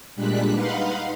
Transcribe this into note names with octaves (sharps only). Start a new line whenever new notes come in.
A#2 G3 G#3 D4 F#6 B6
D#4 B4 F5 F#5 B5 C6